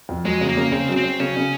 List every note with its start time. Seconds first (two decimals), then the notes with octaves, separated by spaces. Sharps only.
0.09 F2
0.25 F#3 G#3
0.41 C#3
0.49 A#3
0.57 C#3
0.72 C#3 C4
0.89 F#3
0.96 C4
1.04 F#3
1.20 C#3 C#4
1.37 C#3